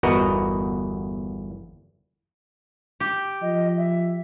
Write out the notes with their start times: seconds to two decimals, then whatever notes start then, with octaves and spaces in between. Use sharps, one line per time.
0.03 G1 E2 F#4 A#4 B4 D#5
3.00 G4
3.42 F3 D#5
3.78 E5